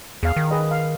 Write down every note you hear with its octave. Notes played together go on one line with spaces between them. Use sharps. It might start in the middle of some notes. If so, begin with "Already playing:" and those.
E2 G#4 F5
D#3
G#4 B4 D#5
F5